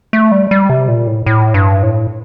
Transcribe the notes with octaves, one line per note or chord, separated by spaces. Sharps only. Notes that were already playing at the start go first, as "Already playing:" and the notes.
A3
G3
G3
C3
A#2
A2
A2
G2
A2